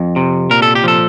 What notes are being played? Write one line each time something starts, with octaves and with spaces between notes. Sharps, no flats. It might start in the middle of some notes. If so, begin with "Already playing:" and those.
Already playing: F2
C3
A#2 A#4
A4
G4
F3 A4